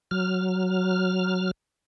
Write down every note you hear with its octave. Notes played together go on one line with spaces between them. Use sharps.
F#3 F6